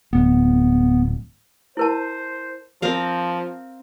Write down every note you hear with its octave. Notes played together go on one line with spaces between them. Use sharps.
D1 B3
E4 A#4 C5 A5
F3 C4 A#4 F5